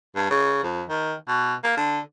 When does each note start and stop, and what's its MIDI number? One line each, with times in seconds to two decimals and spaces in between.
0.16 0.27 43
0.30 0.59 49
0.63 0.83 41
0.89 1.14 51
1.28 1.54 47
1.64 1.73 58
1.77 1.99 50